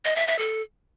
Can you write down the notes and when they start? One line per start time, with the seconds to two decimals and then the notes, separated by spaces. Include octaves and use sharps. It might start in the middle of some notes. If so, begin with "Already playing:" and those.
0.05 D#5
0.16 E5
0.27 E5
0.38 A4